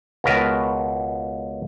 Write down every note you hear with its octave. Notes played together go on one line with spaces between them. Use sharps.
C#2 B2 A#4 B4 A5